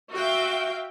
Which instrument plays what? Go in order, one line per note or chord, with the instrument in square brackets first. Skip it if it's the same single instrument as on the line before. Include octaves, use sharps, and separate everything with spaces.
[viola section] F#4 E5 F5 G5